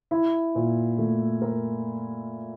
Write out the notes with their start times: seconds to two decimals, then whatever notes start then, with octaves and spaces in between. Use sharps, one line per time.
0.11 E4
0.55 A#2
0.98 A3
1.42 A#4